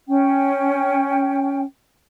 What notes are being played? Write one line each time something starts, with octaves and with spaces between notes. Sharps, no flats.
C#4 G5